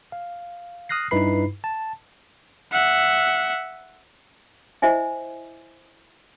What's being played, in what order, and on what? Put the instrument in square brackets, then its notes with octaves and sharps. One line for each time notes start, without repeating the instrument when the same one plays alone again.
[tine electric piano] F5
D#6 F6 F#6 A#6 C7
G2 D#4 E4 B4 B5 C7
A5
[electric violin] E5 F#5
[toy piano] E4 C5 D#5 E5 G#5